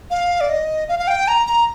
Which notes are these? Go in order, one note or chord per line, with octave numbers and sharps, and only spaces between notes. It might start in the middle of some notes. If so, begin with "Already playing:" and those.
F5
D5
D#5
F5
F5
G5
A#5
A#5